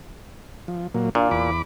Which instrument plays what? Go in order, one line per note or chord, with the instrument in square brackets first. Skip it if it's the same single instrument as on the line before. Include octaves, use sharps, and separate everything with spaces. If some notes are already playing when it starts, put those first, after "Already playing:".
[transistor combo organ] F3
A#2 F#3 A#3
[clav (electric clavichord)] A#2 [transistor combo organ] D4 F4
[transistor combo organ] E2 B5 D6